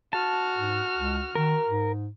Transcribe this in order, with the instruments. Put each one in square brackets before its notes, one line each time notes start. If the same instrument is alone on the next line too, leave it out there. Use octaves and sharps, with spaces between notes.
[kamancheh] F#4 F6 [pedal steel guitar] A5
[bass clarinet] G#2
C#2
[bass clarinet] D#3 [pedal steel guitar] A#4
[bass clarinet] G#2